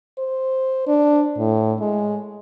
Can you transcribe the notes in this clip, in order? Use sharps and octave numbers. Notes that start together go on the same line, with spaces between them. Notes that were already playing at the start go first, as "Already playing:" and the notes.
C5
D4
A2
G#3